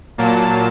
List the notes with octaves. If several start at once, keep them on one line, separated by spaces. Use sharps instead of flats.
A#2 F#3 A#3 A5